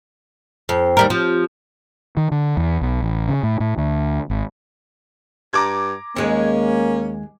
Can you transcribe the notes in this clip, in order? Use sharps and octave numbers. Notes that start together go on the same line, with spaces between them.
F2 C5 G5
D#2 G3 A#4
F3 C4 F4 G4
D#3
D3
E2
B1
A1
C#3
A2
A2
D2
G#1
G2 A#5 D6 G#6
D#2 G#3 A#3 C#4